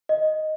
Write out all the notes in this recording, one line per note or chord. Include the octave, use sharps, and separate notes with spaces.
D#5